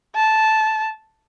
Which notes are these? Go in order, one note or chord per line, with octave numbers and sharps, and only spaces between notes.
A5